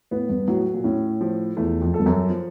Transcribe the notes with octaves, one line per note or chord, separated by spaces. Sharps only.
A2 B3
G2
A2 F#3
A#2
A2 C#4
F3
E2 A3
F2
A4
G2
F#2
F3